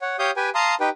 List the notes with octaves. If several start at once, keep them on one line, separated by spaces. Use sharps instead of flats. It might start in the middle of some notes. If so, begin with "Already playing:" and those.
C#5 F#5
G4 C#5 F5 D#6 G6
G4 B4 G5 G#5
F5 A5 A#5 C6 D#6
D#4 G4 B4 G5